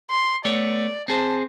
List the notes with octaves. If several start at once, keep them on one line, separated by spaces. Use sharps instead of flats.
C6
A3 B3 C#5 D5
C4 G#4 C5 A5